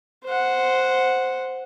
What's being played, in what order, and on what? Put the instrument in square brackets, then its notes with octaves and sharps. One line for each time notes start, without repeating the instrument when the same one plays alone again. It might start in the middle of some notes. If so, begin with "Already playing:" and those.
[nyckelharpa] C5 F#5